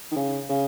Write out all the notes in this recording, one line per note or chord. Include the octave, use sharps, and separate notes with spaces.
D#3
C#3
C#3